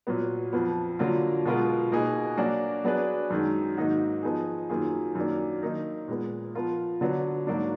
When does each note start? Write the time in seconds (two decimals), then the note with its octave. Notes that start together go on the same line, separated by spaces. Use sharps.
0.07 A#2 F#3 B3
0.53 F2 F3 B3
0.99 D3 F#3 A#3 F4
1.45 B2 G#3 B3 F4 A#4
1.92 B2 A#3 D#4 G#4 B4
2.37 F#3 A#3 D4 F#4 A#4
2.84 F#3 B3 D4 G#4 B4
3.30 F#2 D#3 G#3
3.77 G#2 D#3 A#3 D#4 F#4
4.23 F3 B3 D#4 G#4
4.69 F#2 D#3 A#3 F4 G#4
5.15 F#2 D#3 A#3 D4
5.62 D#3 A#3 D#4 A#4
6.08 A#2 G#3 B3
6.55 F3 B3 F4 A#4
7.01 D3 F#3 B3 D4
7.47 G#2 F#3 A#3 D4